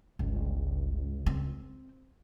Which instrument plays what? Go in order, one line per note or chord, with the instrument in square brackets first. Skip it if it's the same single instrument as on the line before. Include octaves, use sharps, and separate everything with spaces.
[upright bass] G1 [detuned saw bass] C#2
[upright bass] C4